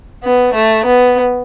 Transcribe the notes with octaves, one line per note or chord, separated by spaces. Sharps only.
B3
A3
B3